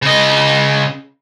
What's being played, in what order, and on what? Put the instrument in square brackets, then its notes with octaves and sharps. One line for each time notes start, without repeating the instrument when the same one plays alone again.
[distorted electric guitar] C#3 D#5